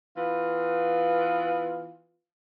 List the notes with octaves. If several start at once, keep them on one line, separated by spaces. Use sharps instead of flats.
E3 B3 F4